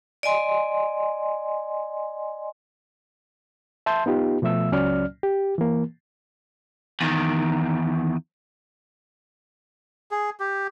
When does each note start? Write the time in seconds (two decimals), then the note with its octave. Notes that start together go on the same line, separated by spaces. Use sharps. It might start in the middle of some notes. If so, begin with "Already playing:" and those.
0.23 D5 D#5 G#5 C6
3.86 E5 A5 C6 G6
4.06 B3 D#4 F4 G4
4.42 B2 F3 A3 E5 E6
4.72 C#2 F#3 C#4 D5 F6
5.23 G4
5.58 E3 A#3
7.01 E2 D#3
10.11 G#4
10.40 G4